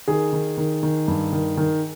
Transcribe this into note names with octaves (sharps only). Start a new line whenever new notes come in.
D#3 G#4
D#3
D#3
D#3
G2
D#3
D#3